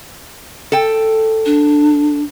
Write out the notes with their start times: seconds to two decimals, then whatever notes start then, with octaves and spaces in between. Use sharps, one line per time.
0.72 A4 G5
1.46 D4